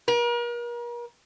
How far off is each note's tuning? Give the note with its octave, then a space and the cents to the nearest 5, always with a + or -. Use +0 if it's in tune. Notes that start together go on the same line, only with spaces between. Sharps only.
A#4 +40